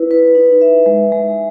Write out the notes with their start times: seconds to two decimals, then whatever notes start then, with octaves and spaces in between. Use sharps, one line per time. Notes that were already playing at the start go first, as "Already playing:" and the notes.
Already playing: E4 B4
0.11 B4
0.35 D#4
0.61 E5
0.86 G#3
1.12 G#3